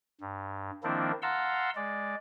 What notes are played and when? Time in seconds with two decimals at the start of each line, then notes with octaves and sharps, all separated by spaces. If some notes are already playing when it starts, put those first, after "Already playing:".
0.21 G2
0.83 D#3 F3 A#3 C4 D4 E4
1.22 F5 F#5 A5 A#5 C6 E6
1.76 G#3 D5